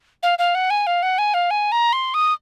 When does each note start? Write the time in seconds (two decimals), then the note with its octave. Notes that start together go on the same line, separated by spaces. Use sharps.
0.23 F5
0.39 F5
0.55 F#5
0.70 G#5
0.87 F5
1.03 F#5
1.18 G#5
1.34 F5
1.51 G#5
1.72 A#5
1.93 C6
2.14 D#6